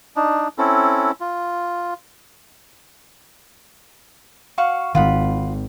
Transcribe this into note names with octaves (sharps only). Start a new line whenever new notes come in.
D4 D#4
C4 C#4 E4 A4
F4
F#4 F5 C#6
G#1 D#3 F4 F#5 B5